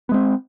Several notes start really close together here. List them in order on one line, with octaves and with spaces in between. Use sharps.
B3 G#3 C4